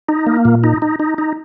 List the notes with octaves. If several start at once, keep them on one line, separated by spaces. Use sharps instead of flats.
D#4
A#3
A#2
D#4
D#4
D#4
D#4